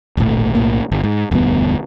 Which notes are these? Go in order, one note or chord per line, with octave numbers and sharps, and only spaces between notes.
D1 G#1 A#2 A3
B1 A2 A#3
G1
G#2
E1 D2 G2 B3